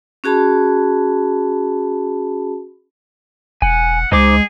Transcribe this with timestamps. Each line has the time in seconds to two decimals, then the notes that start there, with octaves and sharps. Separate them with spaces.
0.24 C#4 F#4 G#4 A5 B5
3.62 E1 F#5 G#5
4.12 C#2 G#3 D#4 G#4 C5 D6